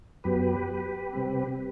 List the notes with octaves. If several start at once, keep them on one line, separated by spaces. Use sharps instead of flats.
F#2 F#3 B3 G4 B4
C3 G3 C4